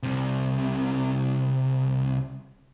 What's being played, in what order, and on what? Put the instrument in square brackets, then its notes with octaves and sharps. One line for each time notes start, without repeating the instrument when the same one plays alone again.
[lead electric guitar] C2 C3